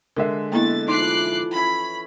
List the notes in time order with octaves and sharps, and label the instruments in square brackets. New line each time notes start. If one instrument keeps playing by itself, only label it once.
[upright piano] D3 G#3 E5 [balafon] A#4
[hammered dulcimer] B2 A4 D5 [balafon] A#3 B3 E4 [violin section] A6
[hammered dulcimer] E3 F3 [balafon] D#4 C6 [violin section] D6 F#6 C7
[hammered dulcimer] C#4 E4 C#5 [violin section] B5